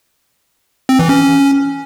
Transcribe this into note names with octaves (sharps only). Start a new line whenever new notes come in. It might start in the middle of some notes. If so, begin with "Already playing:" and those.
C4
E3
C#4